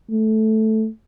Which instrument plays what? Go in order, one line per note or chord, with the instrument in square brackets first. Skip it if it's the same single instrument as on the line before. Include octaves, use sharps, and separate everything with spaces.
[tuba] A3